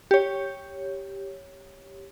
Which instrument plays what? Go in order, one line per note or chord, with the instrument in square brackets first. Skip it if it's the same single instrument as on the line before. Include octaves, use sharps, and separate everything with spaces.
[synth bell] G4 C#5